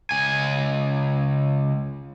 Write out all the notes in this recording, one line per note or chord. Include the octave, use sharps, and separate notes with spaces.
C#2 G#5